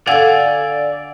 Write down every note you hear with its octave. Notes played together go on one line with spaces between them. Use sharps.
D3 F#4 D5 F5 F#5 G#5 E6